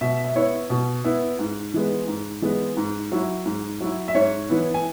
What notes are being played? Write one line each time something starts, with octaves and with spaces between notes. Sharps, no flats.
B2 E5
E5
B3 E4 C#5
B2
B3 E4
G#2
E3 G#3 B3
G#2
E3 G#3 B3
G#2
F#3 E4
G#2
F#3 E4
E5
G#2 C#5
E3 B3 E4
G#5